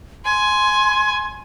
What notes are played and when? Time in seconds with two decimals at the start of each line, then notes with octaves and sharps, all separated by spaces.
0.25 G#5 C6